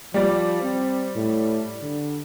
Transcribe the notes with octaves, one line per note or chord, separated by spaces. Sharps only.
F3 G3 D5
C4
A2
D3